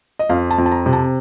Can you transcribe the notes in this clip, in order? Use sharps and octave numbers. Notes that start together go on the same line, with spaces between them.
D#5
F2 F5
A5
F2
A5
A#5
C3
A5